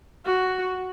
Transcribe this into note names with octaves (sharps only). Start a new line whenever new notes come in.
F#4